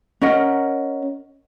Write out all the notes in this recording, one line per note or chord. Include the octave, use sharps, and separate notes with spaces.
C#4 A#4 D#5 F#5